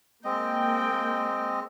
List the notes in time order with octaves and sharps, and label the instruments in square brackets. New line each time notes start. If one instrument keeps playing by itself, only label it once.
[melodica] G#3 C4 D#5 [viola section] A#3 G5